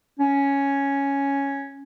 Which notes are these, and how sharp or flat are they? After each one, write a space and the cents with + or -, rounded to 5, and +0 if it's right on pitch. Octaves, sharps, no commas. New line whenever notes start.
C#4 +5